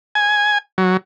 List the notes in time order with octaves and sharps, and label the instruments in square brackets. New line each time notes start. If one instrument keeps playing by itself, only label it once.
[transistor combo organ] G#5
F#3